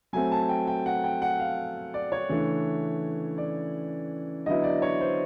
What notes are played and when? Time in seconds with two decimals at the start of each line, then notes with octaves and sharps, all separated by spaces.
0.13 F#3 A3 C4 G#5
0.32 A5
0.49 G5
0.67 G5
0.86 F#5
1.04 G5
1.22 F#5
1.40 F5
1.94 D5
2.12 C#5
2.29 C#3 E3 A3 D4
3.38 D5
4.46 D3 F#3 B3 E4 D#5
4.64 D5
4.82 C#5
5.01 C5